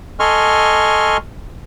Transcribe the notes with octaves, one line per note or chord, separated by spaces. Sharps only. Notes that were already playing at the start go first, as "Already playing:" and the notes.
A4 D#5 G#5 C6 C#6 F6